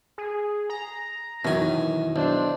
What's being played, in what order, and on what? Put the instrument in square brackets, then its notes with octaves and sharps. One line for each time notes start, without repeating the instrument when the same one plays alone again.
[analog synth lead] G#4
A#5
[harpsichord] F#2 G#5 [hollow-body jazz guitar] B2 D#3 E3
[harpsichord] B1 [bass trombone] D4 [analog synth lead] C5